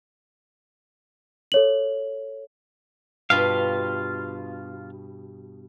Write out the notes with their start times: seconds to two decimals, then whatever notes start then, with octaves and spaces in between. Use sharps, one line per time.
1.52 A4 C#5 F#7
3.30 G2 B2 F4 F5